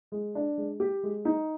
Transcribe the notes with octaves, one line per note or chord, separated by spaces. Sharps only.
G#3
D4
G#3
G4
G#3
D#4